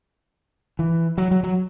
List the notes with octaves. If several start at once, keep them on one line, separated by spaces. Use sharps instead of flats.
E3
F#3
F#3
F#3